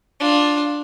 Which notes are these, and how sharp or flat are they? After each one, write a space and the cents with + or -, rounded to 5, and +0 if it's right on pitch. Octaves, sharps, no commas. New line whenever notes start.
D4 +0 F4 +10